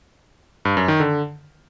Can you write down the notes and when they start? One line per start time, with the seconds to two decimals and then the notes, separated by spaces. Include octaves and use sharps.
0.65 G2
0.77 F#2
0.88 D#3
1.00 D3